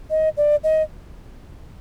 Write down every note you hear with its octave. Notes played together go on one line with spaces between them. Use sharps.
D#5
D5
D#5